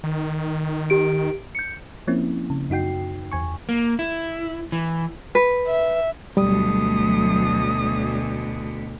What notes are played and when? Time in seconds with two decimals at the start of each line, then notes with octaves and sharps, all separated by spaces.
0.04 D#3
0.90 G4 D7
1.55 G6 C#7
2.07 F3 A#3 C4 C#4 E4
2.50 C#3
2.70 F#2 D#4 F#4 G5 C7
3.31 E2 G#5 C#6
3.69 A#3
3.99 E4
4.72 E3
5.35 B4
5.67 E5
6.37 D2 B2 F#3 G3 A3 D#6